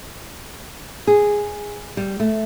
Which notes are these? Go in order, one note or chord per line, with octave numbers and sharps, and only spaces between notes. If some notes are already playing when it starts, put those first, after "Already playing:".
G#4
G3
A3